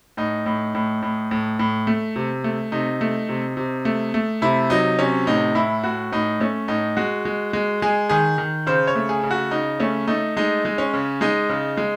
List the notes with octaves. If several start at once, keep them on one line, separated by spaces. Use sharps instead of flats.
A2 D#4
A2
A2
A2
A2
A2
A3
C3
A3
C3 D#4
A3
C3
C3
A3
A3
C3 E4
F#3 D#4
C3 C#4
A2 D#4
A2 E4
A2 F#4
A2 D#4
A3 C#4
A2 D#4
G#3 F#4
G#3
G#3
G#3 G#4
D#3 G#4
D#3
C#3 C5
C#5
A3
G#4
C#3
F#4
C#3 D#4
A3 C#4
A3 D#4
G#3 D#4
G#3
C#4
C#3
G#3 D#4
C#3
G#3